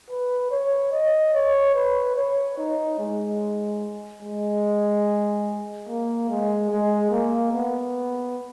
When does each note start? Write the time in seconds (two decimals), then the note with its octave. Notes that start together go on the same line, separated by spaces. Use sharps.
0.10 B4
0.51 C#5
0.92 D#5
1.34 C#5
1.75 B4
2.16 C#5
2.58 D#4
2.99 G#3
4.22 G#3
5.88 A#3
6.29 G#3
6.70 G#3
7.11 A#3
7.52 B3